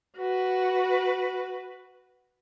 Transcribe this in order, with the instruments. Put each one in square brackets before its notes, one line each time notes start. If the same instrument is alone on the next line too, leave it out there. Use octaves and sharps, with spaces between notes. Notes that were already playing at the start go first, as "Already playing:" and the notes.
[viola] F#4 B4